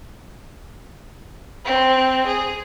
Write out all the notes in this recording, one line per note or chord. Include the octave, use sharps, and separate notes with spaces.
C4
G#4